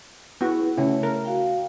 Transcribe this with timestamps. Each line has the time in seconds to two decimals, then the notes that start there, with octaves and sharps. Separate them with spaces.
0.41 B3 E4 F#4 G#4
0.77 C#3 A3 E4 C#5
1.03 A#4
1.25 F#4 F5 G5